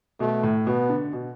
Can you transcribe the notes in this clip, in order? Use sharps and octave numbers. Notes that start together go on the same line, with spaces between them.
B2 A3
A2
B2 B3
D3
B2